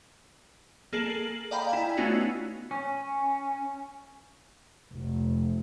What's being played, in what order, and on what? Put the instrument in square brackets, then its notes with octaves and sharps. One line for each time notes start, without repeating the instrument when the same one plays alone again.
[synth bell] A#3 G#4 A4 C7 D7 F#7
F#7
D5 D#5 F5 G5 A#5 B5
E4 G#5
A3 B3 C#4 D#4 F4 F#4
[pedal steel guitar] C#4
[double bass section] F1